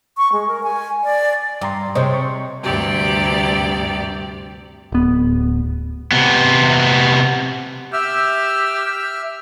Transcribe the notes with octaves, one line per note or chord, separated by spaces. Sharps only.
C#6
G#3
A#4
G#5
D5
G2 D5 A#5 C6
C3 G#3 C5 C#5 D#5
C#6
D2 G2 C3 G4 D5
D1 B3
C3 B3
G4 E5 E6 F6